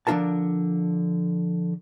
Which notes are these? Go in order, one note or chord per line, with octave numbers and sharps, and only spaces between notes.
D3 F3 D4 F4 A#4 A5